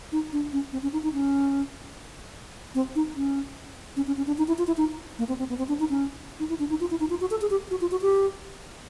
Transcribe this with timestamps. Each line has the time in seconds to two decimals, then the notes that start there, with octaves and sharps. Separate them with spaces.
0.12 D#4
0.33 D4
0.53 C#4
0.73 C4
0.83 C#4
0.93 D#4
1.04 D#4
1.13 C#4
2.75 C4
2.96 D#4
3.16 C#4
3.97 C#4
4.07 C#4
4.17 C#4
4.27 D4
4.38 D#4
4.48 E4
4.58 F4
4.67 E4
4.77 D#4
5.19 A#3
5.28 C4
5.39 C4
5.49 B3
5.58 C4
5.68 D4
5.80 D#4
5.89 C#4
6.40 D#4
6.49 E4
6.59 D4
6.70 D#4
6.80 F4
6.91 E4
7.00 D#4
7.10 F4
7.21 F#4
7.31 A4
7.41 G#4
7.50 G4
7.71 F#4
7.81 F4
7.91 F#4
8.02 G4